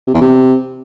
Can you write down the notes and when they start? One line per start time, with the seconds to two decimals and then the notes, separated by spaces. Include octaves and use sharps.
0.07 C3
0.14 E2
0.21 C3